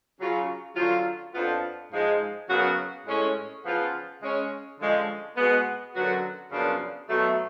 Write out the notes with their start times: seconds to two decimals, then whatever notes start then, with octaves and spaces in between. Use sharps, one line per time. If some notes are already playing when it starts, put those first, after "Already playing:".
0.19 C#3 F#3 C#4 F4
0.76 D3 F#3 C#4 F4
1.34 F2 F3 B3 D4 F4
1.91 G#2 F3 G#3
2.49 F#2 C#3 F#3 B3 F#4
3.06 A2 G#3 C#4
3.64 C#3 F3 B3 F4
4.21 C#3 G#3 C#4
4.78 D3 F3 G#3 C#4
5.37 B2 G#3 B3
5.94 F#2 D3 F#3 B3 F#4
6.52 F#2 C#3 F3 B3 D4
7.09 B2 F#3 A3